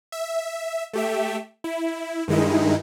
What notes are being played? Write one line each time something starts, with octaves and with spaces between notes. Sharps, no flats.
E5
A3 G4 E5
E4
G2 D#3 G#3 D#4 E4